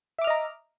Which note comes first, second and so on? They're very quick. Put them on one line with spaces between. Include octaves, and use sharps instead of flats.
E5 D6 F6 D#5 A#5